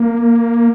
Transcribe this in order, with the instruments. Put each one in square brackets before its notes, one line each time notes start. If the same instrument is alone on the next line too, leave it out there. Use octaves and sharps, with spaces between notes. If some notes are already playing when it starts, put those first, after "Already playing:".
Already playing: [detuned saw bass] A#3